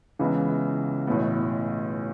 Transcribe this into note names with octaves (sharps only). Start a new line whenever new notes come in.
C#2 C#3 E3 B3 E4
B1 A2 E3 B3